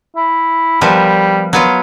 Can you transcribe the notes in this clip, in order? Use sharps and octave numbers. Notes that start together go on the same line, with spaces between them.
E4
F3 G3 B3 A#4
F#3 B3 F4